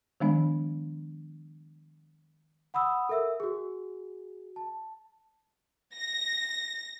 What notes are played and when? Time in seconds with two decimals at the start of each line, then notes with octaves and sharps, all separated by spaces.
0.20 D#3 F3 G#3 B3 D4
2.74 F#5 B5 D#6 E6
3.09 A4 A#4 E5 E6
3.40 F#4 G#4
4.56 A5
5.95 A#6